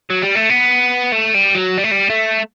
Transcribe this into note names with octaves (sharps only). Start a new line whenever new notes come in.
F#3
G3
A3
B3
A3
G3
F#3
G3
A3
G3
A3